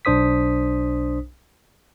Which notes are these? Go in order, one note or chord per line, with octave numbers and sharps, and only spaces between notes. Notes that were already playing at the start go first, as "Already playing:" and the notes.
B1 D4 C5 D#6 B6